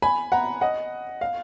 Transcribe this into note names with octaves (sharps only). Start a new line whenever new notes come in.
G#5 B5
F#5 A#5
D#5 F#5
F5